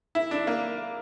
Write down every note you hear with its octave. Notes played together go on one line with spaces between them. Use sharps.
E4
D4
A#3